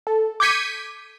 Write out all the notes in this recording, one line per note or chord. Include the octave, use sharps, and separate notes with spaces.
A4
D6 G6 G#6 B6 C#7 D#7